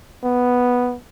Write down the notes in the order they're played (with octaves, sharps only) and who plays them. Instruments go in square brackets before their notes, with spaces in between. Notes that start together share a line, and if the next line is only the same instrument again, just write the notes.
[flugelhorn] B3